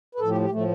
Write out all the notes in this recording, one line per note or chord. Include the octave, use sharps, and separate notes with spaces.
B4
A2 F3 A4
G4
G4
A2 F3 A3